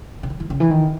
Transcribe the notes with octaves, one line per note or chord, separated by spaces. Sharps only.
C#3
D#3
E3
C#3
E3
D#3